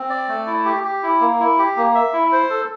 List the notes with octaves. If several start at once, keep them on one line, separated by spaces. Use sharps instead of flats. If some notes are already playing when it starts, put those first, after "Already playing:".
Already playing: C4
D5
A3
E4
G4
G4
E4
A#3
E4
G4
A#3
E5
E4
C5
A4